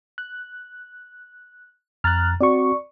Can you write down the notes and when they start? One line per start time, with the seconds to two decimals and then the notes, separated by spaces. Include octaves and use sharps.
0.18 F#6
2.04 F2 A#5 F6 F#6 A6
2.41 C4 F#4 D5 C#6